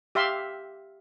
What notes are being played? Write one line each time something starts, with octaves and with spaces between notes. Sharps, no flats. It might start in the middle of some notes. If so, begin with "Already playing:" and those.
G4 E5 F5 C6